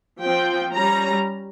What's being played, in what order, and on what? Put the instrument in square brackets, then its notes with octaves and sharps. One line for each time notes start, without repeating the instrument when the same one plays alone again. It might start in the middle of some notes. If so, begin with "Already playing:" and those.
[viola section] F3 C4 G5
G3 C#4 A#5